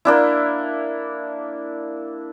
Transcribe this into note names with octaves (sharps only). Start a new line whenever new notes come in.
A#3 D4 E4